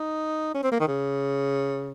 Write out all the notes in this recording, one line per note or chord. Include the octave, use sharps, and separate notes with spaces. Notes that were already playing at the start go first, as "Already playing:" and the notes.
Already playing: D#4
C#4
C4
A#3
D#3
C#3